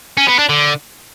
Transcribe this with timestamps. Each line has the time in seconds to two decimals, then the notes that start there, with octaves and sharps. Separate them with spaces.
0.17 C#4
0.28 B3
0.39 D4
0.49 D3